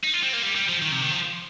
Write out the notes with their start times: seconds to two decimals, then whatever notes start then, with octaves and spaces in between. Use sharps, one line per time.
0.04 D#4
0.14 F4
0.23 C4
0.33 A#3
0.43 G3
0.55 G3
0.68 F3
0.82 D#3
0.92 C3
1.02 D#3
1.11 F3